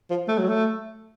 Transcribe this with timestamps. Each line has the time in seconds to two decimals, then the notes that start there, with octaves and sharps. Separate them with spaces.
0.10 F3
0.28 A3
0.38 F#3
0.48 A3